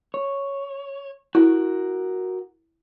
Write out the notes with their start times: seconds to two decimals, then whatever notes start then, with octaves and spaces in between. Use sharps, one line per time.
0.14 C#5
1.35 E4 F#4 A#4